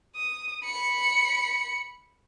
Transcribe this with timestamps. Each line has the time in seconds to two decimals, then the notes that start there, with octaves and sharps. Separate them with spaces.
0.16 D#6
0.66 B5 C#7